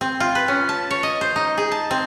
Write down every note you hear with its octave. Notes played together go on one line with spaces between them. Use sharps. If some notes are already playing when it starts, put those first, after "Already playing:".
C4
F4
B4
C#4
A5
C#5
D#5
C5
D#4
G#4
A5
C4